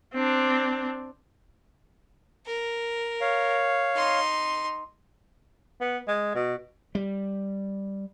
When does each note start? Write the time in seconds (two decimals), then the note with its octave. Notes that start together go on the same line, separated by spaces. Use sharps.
0.14 C4 D4
2.46 A#4
3.21 C#5 F5
3.95 D#4 C6
5.81 B3
6.08 G#3
6.35 B2
6.95 G3